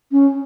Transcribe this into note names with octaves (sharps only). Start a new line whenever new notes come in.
C#4